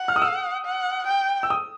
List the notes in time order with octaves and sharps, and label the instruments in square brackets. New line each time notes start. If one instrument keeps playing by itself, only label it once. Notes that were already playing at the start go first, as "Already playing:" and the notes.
Already playing: [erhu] F#5
[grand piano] F6
D#6
E6
[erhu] F#5
G5
[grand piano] E6
D#6